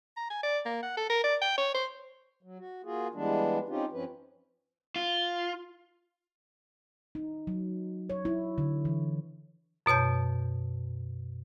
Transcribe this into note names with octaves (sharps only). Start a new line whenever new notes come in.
A#5
G#5
D5
A#3
F#5
A4
A#4
D5
G5
C#5
C5
F#3
F#4
A#3 F4 F#4 G#4
E3 G3 G#3 B3 D4
C4 C#4 D#4 F4 G4
G2 F3 C4 C#4 B4
F4
D#4
F#3
C#5
E4
D3
E3
F#2 B2 C#5 A5 G6